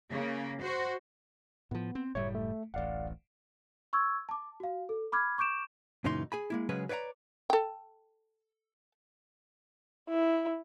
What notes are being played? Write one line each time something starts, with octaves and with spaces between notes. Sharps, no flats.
C#3 A#3
F#4 C5
A2 F3 B3
C4
F#1 A2 G3 C#5 E5
A3
D1 A1 D5 F5 F#5
C6 C#6 E6 G#6
A5 D6
F#4 F5
A4
B5 D6 F6 G#6
C#6 D6 G6 D7 E7
F#2 A#2 C#3 E3 D#4 C6
G#4 G#5 B5
G#3 A#3 E4
C#3 F#3 G#3 C#4 G#4 B4
B4 C#5 D5 F5 A#5
A4 G5
E4